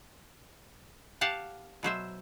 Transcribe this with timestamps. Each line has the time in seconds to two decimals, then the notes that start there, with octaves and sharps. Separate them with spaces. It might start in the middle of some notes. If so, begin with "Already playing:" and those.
1.21 G4 F5 F#5 A5
1.83 B2 F#3 C5 E5